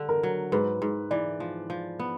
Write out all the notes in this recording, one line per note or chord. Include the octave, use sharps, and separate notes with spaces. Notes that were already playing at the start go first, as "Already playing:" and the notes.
Already playing: D3 G3
A#4
F#3
G#2 B4
G#2
E3 D5
F3
F3
B3